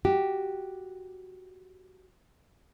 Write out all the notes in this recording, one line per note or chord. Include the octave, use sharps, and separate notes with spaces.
F#4 G4